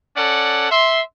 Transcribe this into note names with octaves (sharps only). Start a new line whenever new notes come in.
C#4 A4 D5 F#5
E5 C6